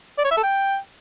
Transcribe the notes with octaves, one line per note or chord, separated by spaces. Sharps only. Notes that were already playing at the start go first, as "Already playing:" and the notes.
D5
C#5
E5
A4
G5